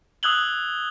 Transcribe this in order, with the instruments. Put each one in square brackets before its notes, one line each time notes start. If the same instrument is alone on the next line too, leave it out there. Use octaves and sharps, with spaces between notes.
[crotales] D#6 E6 F#6 G#6 F#7 G7